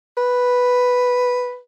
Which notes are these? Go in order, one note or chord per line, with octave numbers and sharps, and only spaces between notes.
B4